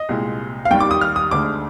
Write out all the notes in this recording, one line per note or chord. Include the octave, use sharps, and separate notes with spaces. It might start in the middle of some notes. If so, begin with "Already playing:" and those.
Already playing: D#5
C2 A#2 G#3
F5
D#2 D#3 G3 G5
D6
D#6
F6
D#6
D2 D3 G#3 D6